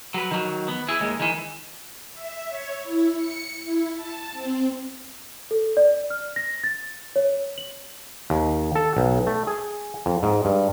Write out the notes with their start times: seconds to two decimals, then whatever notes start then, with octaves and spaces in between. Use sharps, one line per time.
0.14 F#3 B4
0.31 D#3 F#3
0.68 B3
0.88 E4 G#4
1.00 D#2 G#3
1.20 D#3 E3
2.13 E5
2.49 C#5
2.84 E4
3.17 C#7
3.64 E4
3.96 A5
4.33 C4
5.51 A4
5.77 D5
6.10 F6
6.36 A#6
6.64 A6
7.16 C#5
7.58 F#7
8.30 D#2
8.75 A4
8.97 B1
9.27 A3
9.47 G#4
10.06 F2
10.23 G#2
10.45 G2